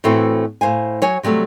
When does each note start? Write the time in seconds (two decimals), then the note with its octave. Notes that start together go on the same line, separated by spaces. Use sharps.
0.04 A2 E3 A3 C4 F#4 B4
0.61 A2 C5 F5 G#5
1.02 F#3 C#5 G#5
1.23 C3 F#3 G3 A3